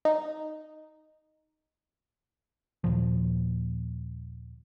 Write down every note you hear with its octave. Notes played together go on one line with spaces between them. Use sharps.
D#4
D#2 A#2 F3